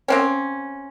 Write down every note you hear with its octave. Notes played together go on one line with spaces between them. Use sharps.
A#3 C4 C#4